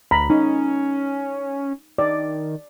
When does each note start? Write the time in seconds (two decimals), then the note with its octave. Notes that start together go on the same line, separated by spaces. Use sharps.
0.11 D2 A#5 B5
0.30 C#4 D#4
1.98 D#3 D5